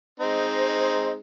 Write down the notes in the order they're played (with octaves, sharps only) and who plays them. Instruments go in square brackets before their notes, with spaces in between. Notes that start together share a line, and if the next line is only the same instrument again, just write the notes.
[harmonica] G#3 C4 D#4 [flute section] C5 D#5